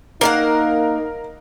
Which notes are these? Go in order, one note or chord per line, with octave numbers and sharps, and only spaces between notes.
A#3 D#4 A#4 F5 F#5